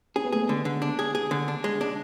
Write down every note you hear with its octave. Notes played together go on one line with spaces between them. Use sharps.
C#4 G#4
B3
A3 G#4
G#3 B3
D3
D3
D4
G#4
G#4
D3
D4
G#3
D4